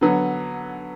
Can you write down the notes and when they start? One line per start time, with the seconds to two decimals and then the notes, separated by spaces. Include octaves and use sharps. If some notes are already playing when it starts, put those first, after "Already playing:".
0.01 D3 F#3 B3